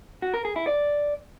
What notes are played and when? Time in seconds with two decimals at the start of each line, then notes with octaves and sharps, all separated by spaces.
0.22 F#4
0.34 A#4
0.45 G#4
0.56 E4
0.67 D5